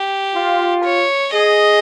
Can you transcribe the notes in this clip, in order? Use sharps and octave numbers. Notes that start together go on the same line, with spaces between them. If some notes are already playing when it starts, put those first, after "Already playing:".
Already playing: G4
F4
C#5
G#4 D#5